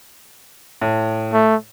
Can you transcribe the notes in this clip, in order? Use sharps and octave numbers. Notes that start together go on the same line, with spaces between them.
A2
A3